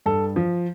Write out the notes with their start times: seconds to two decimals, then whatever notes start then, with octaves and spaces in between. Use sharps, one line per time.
0.06 G2 A4
0.36 F3